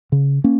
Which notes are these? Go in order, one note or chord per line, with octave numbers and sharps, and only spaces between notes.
C#3
A#3 C#4